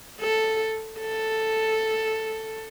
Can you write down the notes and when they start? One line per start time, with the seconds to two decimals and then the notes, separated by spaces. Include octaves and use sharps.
0.21 A4
1.00 A4